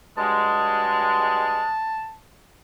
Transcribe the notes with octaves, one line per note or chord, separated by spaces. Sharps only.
G2 F#3 G#3 A5